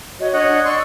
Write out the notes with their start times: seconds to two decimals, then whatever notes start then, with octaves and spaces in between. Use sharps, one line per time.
0.19 F#4 C#5 D#5
0.33 D4 C#5 D#5 F#5
0.47 D4
0.65 D5 D#5 C6 C#6 E6